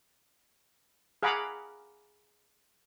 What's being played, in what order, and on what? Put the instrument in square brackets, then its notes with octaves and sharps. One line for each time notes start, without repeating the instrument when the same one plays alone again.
[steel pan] G#4 F5 F#5 A#5 B5 D6